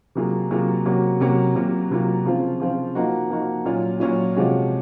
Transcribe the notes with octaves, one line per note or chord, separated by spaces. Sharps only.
C3 F#3 A#3 F4 G#4
C3 F#3 A#3 F4 G#4
C3 F#3 A#3 C#4 F#4
C3 F#3 A#3 C#4 F#4
C3 F#3 A#3 F4
C3 F#3 A#3 F4
C#3 F3 C4 F4
C#3 F3 C4 F4
F3 A#3 D#4 F#4
F3 A#3 D#4 F#4
A#2 F#3 C#4 F4
A#2 F#3 C#4 F4
C3 F3 G#3 C#4 F#4